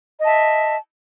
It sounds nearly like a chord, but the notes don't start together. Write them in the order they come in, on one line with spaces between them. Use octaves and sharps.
D#5 A5 E5